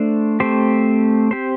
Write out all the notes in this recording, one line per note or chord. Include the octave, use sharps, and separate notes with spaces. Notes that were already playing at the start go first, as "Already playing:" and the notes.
Already playing: A3 D4 C5
A3 C4 G4 C5
C4 G4 C5